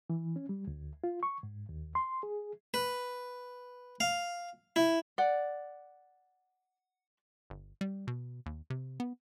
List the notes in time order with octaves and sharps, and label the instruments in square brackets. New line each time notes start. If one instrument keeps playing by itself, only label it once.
[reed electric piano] E3
C#4
G3
D2
F4
C#6
G#2
D#2
C6
G#4
[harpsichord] B4
F5
E4
[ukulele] D5 F#5
[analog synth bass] G1
G3
B2
D#2
C3
B3